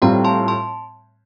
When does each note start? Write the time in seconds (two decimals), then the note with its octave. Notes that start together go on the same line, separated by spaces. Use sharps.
0.02 A2 G3 C4 F4 G5 A#5
0.24 A5 C6
0.48 A5 C6